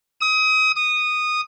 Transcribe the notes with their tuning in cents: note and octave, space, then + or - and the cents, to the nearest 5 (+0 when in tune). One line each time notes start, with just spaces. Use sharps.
D#6 +30
D#6 -10